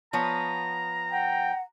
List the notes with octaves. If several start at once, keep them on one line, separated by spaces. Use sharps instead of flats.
F3 B3 C#5 A#5
F#5 G5